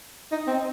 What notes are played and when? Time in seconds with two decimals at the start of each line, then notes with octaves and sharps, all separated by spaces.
0.32 D#4
0.47 C4